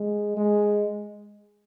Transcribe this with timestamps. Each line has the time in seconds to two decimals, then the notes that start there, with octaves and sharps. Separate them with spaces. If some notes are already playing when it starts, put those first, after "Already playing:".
Already playing: G#3
0.37 G#3